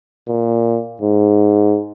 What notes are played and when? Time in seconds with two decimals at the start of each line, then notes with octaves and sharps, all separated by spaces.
0.28 A#2
1.02 G#2